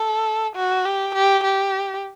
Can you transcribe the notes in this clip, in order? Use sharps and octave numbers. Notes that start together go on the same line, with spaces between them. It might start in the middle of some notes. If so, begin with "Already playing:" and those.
Already playing: A4
F#4
G4
G4
G4